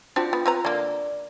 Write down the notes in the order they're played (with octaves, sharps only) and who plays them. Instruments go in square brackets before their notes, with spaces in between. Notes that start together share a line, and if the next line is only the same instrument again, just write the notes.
[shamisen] C4 D4 F#4 [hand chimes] F4 G5
[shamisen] B3
C4 B4 A#5
[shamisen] D3 A#3 [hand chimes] D5